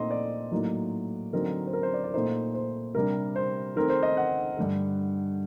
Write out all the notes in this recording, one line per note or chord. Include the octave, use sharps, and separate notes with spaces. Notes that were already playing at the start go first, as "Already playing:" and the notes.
Already playing: A#2 A3 C4 D#4 D#5 C6
D5
A2 F#3 A#3 D#4
D3 F#3 C4 D#4 A#4
C5
A#4
C5
D5
D5
A#2 A3 D#4 C5
C5
C3 G3 D4 A#4
C5
D#3 A3 C4 A#4
C5
D#5
F#5
G2 D3 A3